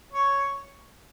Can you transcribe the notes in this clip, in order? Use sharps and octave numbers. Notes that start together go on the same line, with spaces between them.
C#5